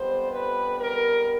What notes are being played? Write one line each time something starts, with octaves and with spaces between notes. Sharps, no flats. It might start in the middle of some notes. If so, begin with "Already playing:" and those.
Already playing: F2 D3 G3 B3 C5
B4
A#4